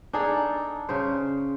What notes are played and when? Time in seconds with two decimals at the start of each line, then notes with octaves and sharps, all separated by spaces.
0.13 D4 D#4 G#4 A4
0.89 C#3 C5